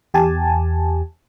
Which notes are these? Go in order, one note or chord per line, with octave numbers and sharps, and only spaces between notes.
E2 G4 G#5 A5